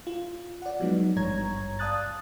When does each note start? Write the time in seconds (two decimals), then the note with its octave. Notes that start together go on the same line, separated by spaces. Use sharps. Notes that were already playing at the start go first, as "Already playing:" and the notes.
0.07 F4
0.62 D5 F#5
0.80 F3 F#3 G#3 B3 D#4
1.16 G#1 G2 C#5 A#5 G#6
1.79 D5 F5 A5 D#6 F#6 A6